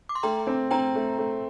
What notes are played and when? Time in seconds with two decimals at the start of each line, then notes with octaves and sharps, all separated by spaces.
0.09 D6
0.15 C6
0.23 A3 G5 A#5
0.47 C4
0.71 C4 G5 A#5
0.95 A3
1.18 A3